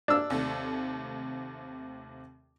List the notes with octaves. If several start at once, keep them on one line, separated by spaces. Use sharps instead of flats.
D4 E6
D#2 C3 A3